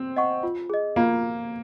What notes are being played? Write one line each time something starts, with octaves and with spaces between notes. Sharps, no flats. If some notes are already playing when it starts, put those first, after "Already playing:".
Already playing: C4
D#5 F#5 C#6
F4
G#4 D#5
A#3 F4